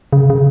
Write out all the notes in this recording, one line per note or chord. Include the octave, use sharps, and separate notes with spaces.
C#3
C#3